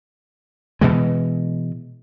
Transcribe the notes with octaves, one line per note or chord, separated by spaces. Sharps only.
B2 E3 G#3